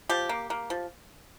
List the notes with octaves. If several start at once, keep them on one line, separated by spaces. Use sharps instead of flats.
F3 G4
A#3
A#3
F3